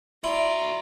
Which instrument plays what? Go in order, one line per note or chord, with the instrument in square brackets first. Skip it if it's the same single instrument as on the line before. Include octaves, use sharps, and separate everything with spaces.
[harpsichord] E4 [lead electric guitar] F#4 C6 [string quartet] D5 A#5